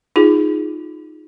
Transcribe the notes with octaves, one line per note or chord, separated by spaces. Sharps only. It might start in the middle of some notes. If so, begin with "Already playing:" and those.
D#4 F4 G#4